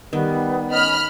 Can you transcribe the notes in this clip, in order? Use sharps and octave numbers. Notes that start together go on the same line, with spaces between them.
D#3 G3 B3
C#4 D#5 B5 F6